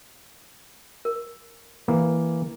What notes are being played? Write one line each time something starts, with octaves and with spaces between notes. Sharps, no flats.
A#4
E3 A#3